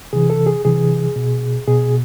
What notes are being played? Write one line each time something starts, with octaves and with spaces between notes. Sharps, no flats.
C3 E3 G#4
A4
G#4
C3 E3 G#4
B2
B2 G#4